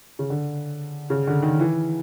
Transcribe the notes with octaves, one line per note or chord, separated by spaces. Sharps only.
C#3
D3
C#3
D3
D#3
E3